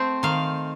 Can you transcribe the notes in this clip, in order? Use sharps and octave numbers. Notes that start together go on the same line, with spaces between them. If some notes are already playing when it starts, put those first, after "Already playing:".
Already playing: A3 C4
D#3 F5